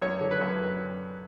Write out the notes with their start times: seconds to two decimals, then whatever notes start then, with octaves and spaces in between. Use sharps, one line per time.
0.01 F#2 C#5
0.21 D3
0.31 B4
0.41 F#2